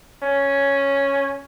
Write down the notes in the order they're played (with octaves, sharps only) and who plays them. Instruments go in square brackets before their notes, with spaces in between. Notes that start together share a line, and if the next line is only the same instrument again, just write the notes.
[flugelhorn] C#4